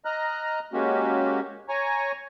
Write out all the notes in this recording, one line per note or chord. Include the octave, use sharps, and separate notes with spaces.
D#5 A#5 F6 F#6
G#3 A#3 C#4 F#4 G4
C#5 G#5 A#5 C#6